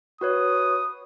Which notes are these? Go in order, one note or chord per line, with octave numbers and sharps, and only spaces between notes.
F#4 B4 C#5 D#6